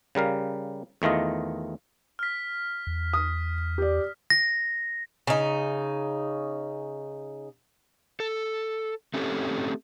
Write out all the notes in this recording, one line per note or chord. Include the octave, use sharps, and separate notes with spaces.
C#3 G3 A#4 F5
E2 D#3 A3 F4 D#5
F6 B6
E2
D#6
G4 D5
A#6
C#3 D#4
A4
A3 C4 C#4 G4 A4